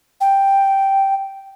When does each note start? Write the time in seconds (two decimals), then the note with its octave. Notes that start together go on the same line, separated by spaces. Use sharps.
0.21 G5